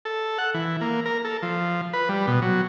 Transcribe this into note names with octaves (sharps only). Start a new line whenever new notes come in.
A4
F#5
E3
A#3
A#4
A4
F3
B4
G3
B2
F#3